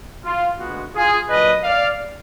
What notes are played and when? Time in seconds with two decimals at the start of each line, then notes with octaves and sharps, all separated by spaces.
0.25 F4
0.59 D2 D3 G#3 B3 F4 F#4
0.94 F4 G#4
1.29 A#2 F#3 D4 B4 D#5
1.63 D5 F5